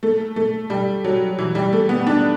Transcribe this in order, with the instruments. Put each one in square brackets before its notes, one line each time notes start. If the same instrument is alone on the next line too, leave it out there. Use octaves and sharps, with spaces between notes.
[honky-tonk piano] A3
A3
G3
F#3
E3
G3
A3
B3
D4